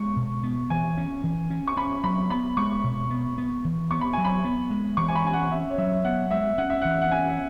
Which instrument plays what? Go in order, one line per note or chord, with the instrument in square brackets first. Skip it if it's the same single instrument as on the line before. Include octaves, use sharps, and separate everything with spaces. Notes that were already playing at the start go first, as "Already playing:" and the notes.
Already playing: [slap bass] G#3 B3 [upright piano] C#6
[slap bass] B2
B3
[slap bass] E3 [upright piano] G#5
[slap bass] C#4
E3
C#4
[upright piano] C#6
[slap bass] C#4 [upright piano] B5
[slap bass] F#3 [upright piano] B5
[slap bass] B3 [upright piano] B5
[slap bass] G#3 [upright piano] C#6
[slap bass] B2
B3
B3
E3
[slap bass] B3 [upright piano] C#6
[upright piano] B5
[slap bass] F#3 [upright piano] G#5
[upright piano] B5
[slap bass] B3
G#3
[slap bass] E3 [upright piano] C#6
[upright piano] G#5
B5
[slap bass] C#4 [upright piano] G#5
[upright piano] F#5
[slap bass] C#4 [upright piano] E5
[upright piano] C#5
[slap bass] F#3 [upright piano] E5
[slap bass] B3 [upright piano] F#5
[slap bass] G#3 [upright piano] E5
[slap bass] C#4 [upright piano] F#5
[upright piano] E5
[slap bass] E3 [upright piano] F#5
[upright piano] F#5
[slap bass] C#4 [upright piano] G#5
[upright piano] E5